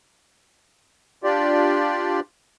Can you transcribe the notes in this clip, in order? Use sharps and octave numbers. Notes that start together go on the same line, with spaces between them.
D4 F4 G4 D5